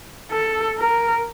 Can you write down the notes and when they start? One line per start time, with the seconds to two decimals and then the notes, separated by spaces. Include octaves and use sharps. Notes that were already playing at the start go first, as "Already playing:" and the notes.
0.32 A4
0.79 A#4